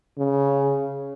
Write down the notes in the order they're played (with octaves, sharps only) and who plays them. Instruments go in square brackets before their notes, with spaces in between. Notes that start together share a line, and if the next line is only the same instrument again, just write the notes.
[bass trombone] C#3